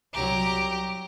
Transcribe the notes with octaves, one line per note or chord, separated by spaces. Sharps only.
C2 F#3 G4 A#5